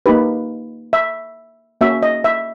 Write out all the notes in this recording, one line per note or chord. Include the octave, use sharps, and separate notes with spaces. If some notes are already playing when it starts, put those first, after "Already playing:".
A#3 D#4 G4 B4
E5
A#3 C#4 F#4 E5
D#5
E5